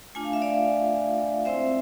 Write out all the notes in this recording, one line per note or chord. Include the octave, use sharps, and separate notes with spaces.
A3 D4 F4 G#5
F5
E5
D5 F5
G#3 C4 E4 C5 E5